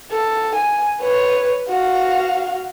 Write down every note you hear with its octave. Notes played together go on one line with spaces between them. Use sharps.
A4
G#5
B4 C#5
F#4 F5